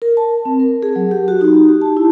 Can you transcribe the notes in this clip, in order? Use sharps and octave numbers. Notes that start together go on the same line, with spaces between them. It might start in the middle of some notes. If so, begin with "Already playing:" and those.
A#4
A5
C4
A#4
G#4
F#3
G4
F#4
D#4
G4
A5
E4